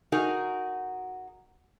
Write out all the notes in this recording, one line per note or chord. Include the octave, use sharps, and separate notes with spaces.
D#4 F#4 G#4 A#4